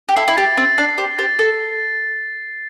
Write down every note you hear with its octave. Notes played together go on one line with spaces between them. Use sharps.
G4
E4 A4 C7
E4
G4 A6
C4 A6
D4 C7
G4 C5 C7
G4 C5 A6
A4